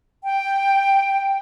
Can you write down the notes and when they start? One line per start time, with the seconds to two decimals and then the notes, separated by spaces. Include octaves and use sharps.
0.24 G5